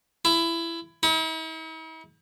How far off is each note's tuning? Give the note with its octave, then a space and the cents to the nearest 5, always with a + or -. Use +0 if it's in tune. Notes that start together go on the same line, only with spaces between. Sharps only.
E4 +20
E4 -45